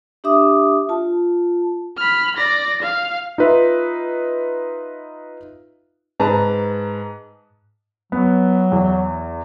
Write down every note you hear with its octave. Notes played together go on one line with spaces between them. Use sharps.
D4 G4 E5 D6 D#6
F4 A5
B5 F6
D5 A#6
F5
D#4 F4 B4 E5
G#2 B4 A5 A#5
F#3 B3
E2